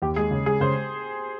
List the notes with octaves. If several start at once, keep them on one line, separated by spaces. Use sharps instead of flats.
D#2 G4
G#3 G#4
C#3
G#3 G#4
C#3 C5